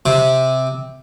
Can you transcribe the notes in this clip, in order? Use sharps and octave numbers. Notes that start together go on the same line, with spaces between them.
C3